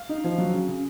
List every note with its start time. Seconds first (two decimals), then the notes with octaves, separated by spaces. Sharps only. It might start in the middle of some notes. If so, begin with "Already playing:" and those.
Already playing: F5
0.09 D#4
0.24 F3
0.38 F#3
0.53 C#3
0.68 C#3